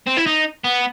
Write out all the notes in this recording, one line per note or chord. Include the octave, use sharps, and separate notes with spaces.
C4
E4
D#4
B3